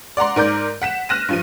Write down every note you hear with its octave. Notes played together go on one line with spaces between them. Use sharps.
D5 F#5 A#5 C6
G#2 A#4 D5 G6
F#5 B6 E7
F6 F#6 A#6 D#7 E7
G2 F3 D#7